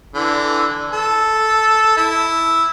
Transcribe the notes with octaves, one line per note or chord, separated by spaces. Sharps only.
D3 E3
A4
E4